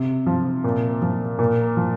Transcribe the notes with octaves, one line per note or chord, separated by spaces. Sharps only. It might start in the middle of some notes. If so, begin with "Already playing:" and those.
Already playing: C3
F3
A#2
F3
A#2
F3